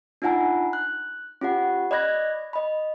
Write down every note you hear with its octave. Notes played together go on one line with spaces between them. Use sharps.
D4 D#4 F4 F#5 G#5 A#5
F#6
C#4 F4 G4 F#5
D5 D#5 B5 F#6 G#6 A#6
D#5 B5